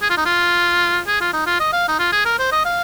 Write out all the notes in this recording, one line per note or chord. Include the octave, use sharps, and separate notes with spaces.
G#4
F4
D#4
F4
G#4
F4
D#4
F4
D#5
F5
D#4
F4
G#4
A#4
C5
D#5
F5